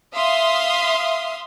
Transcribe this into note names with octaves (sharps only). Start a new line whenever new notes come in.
E5 F5 C6 D#6